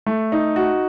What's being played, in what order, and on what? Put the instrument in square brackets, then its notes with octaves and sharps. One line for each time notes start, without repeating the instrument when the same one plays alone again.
[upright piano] A3
D#4
F#4